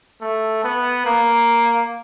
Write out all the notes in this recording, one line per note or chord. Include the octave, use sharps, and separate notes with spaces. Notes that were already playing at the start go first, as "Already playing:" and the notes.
A3
B3
A#3